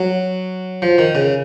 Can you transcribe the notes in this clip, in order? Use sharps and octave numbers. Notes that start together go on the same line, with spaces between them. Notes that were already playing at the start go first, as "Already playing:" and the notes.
Already playing: F#3
F3
D#3
C#3